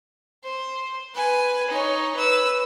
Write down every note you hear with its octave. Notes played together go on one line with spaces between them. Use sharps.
C5
B4 G#5
D#4 C#5
B4 E6